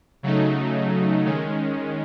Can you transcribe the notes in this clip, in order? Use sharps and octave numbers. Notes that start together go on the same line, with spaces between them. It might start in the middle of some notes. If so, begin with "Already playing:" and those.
C#3 F#3 A3 D#4
D#3 G#3 C#4